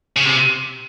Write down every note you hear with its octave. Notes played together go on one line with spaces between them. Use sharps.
C#3
C3